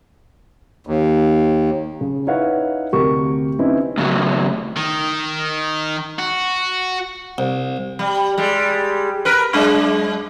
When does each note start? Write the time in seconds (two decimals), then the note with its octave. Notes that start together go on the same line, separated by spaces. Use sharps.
0.87 D#2
2.01 C#3
2.27 D#4 E4 B4 C#5 F5 F#5
2.93 D2 C3 G4 A#4 C#6
3.59 C4 C#4 D#4 E4 B4
3.98 A2 C#3 F#3
4.77 D#3
6.19 F#4
7.38 C2
7.99 G3
8.38 G3 G#3
9.25 A#4 B4
9.53 F#2 G#3 D4